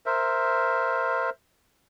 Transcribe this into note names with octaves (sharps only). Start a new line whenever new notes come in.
A#4 C5 E5